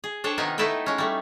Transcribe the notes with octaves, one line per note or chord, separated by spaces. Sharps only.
G#4
D4 A4 C5 C#5 G5
C3 D#3 B3 D#4 F4 G#5
A3 D#4 E4 A4 B4 G5
G#3 C#4
G3 A3